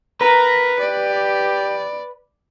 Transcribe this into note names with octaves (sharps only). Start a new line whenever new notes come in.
A#4 B4 A#5
G4 D5